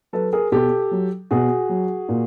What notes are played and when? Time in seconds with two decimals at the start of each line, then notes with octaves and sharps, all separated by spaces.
0.13 F#3 A4 B4
0.33 G#4 A#4
0.52 B2 G4 A4
0.91 F#3
1.31 B2 F#4 G#4
1.69 F#3
2.09 A#2